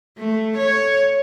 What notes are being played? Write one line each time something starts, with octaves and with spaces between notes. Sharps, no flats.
A3
C#5